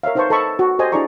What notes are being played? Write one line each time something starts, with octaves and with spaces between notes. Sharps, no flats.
A#4 C#5 E5 F5
D#4 B4 C5 F5 A5 C#6
A4 D#5 A5 B5 C#6
F#4
G4 A4 C5 D#5 G#5
D4 E4 G#4 D5 A#5 C#6